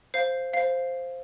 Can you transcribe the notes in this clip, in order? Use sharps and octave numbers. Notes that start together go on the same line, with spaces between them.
C5 F5 C7
C5 F5 C7